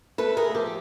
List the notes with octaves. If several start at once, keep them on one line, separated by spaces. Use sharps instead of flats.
A3 A4 B4
G#4 A#4
F3 G4 A4